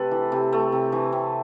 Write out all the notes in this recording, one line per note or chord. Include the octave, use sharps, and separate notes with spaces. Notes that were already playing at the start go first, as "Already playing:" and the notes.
Already playing: C3 A3 A4 B4
E3
C3
A3
C3
E3
C3